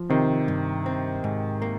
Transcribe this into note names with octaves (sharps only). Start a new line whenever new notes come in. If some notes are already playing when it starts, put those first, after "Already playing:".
Already playing: F3
C3 D#3 C4
G2
C4
G#2
A#3